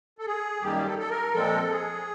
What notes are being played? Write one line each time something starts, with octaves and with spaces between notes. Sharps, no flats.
A4
G#4
F#2 D#3 G3 A#3 G4
A4
A4
A#4
A#2 F3 G#3 C4 A4
G#4